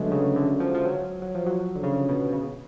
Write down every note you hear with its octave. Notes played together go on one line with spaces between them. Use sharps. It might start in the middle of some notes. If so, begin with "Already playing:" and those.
Already playing: D3 F#3 G#3 A3 B3
C#3
D3
F3
F3
F#3
F#3
F3
F#3
D3
C#3
B2
C#3